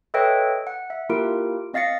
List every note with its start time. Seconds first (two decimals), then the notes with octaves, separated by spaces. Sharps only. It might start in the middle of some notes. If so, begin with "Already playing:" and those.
0.14 A4 B4 C#5 D#5 E5 G5
0.67 F#5
0.90 E5
1.09 A#3 E4 F4 G4 A#4 D7
1.74 C4 D#5 F5 A6 A#6 C#7